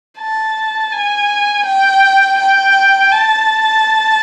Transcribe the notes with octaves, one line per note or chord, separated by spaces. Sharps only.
A5
G#5
G5
G5
A5